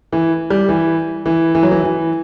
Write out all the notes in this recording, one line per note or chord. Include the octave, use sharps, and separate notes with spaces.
E3
G3
E3
E3
E3
F#3
E3
E3